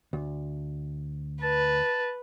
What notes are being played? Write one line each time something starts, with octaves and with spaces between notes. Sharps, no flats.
D2
B4 A5